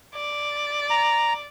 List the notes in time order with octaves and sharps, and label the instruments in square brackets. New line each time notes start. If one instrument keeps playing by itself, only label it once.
[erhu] D5
[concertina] A#5